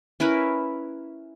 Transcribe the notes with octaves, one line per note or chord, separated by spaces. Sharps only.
C#4 E4 A#4 B4